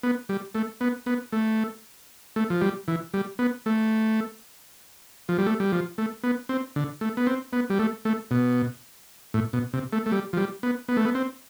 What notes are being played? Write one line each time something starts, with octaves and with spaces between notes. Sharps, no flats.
B3
G3
A3
B3
B3
A3
A3
F3
G3
E3
G3
B3
A3
F3
G3
A3
G3
F3
A3
B3
C4
D3
A3
B3
C4
B3
G3
A3
A3
B2
A2
B2
C3
A3
A3
G3
F3
G3
B3
B3
A3
B3
C4